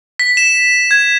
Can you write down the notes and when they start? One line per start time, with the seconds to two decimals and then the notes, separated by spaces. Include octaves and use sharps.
0.19 B6
0.37 E7
0.91 G#6